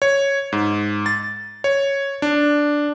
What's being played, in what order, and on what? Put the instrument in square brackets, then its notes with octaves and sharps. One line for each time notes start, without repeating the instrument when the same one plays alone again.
[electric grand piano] C#5
G#2
A6
C#5
D4